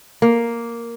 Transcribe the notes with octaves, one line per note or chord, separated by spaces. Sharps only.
A#3